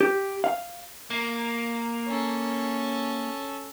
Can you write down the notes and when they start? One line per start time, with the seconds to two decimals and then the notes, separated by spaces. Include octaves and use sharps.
0.01 G4
0.44 F5
1.10 A#3
2.07 C#4 A4